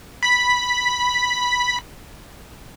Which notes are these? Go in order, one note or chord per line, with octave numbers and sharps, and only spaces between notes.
B5 B6